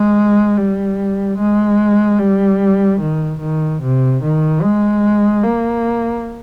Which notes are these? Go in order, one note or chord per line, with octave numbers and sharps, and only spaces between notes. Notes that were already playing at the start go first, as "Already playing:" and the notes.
Already playing: G#3
G3
G#3
G3
D#3
D#3
C3
D#3
G#3
A#3